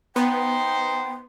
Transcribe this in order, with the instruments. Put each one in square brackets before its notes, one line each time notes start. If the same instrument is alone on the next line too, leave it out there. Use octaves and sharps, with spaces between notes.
[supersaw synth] B3 [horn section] D#4 C5 [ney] G5